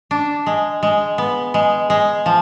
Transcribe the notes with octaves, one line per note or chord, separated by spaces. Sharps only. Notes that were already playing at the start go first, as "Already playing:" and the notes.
D4
G#3
G#3
B3
G#3
G#3
F3